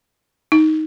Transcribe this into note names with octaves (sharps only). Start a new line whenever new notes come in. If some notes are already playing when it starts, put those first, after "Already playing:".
D#4